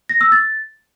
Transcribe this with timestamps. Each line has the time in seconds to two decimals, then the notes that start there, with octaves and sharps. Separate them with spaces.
0.09 A#6
0.21 E6
0.32 A6